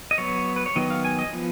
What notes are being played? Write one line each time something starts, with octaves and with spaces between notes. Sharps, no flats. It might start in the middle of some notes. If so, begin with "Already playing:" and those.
D#5
F#3 B3 C#5
B4
C#5
D#3 F#3 B3 D#5
F5
G#5
D#5
F3 B3